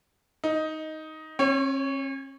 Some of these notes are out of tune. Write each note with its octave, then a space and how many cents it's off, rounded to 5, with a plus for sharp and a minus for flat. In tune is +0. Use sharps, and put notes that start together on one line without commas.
D#4 +10 D#5 +0
C#4 -45 C#5 +5